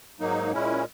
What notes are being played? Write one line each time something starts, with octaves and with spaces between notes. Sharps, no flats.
G#2 F#3 A#3 D#4
A#2 G#3 C#4 E4